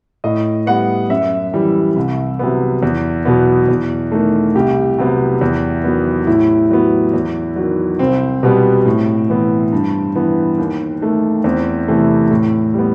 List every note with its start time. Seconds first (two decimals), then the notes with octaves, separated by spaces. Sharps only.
0.24 A2 D#5
0.66 G3 B3 F#5
1.10 F#2 E5
1.53 E3 G3
1.96 C2
2.39 C3 F#3 B3
2.83 E2
3.25 B2 F#3 B3
3.68 E2
4.12 D#3 A3
4.55 C2 G4
4.99 C3 F#3 B3
5.41 E2
5.84 D#3 F#3 B3
6.27 A2 E4
6.71 F#3 B3
7.13 E2
7.56 D#3 F#3
7.99 C2 C4
8.43 B2 G3 B3
8.85 A2
9.29 E3 B3
9.73 G2
10.16 E3 B3
10.58 D#2
11.02 D#3 A3
11.44 E2 C4
11.88 C3 E3 A3
12.30 A2
12.74 G3 B3